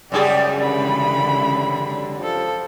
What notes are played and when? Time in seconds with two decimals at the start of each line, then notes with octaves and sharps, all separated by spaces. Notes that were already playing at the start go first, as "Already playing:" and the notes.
0.12 F#2 C#3 E3 G3 G#3 G4 G#4 D5
0.61 D3 B5
2.23 F3 A4